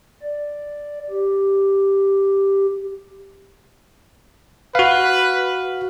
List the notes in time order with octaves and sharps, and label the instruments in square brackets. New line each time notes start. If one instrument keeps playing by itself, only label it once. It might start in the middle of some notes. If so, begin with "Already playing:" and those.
[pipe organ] D5
G4
[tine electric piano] F#4 F5 [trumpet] B4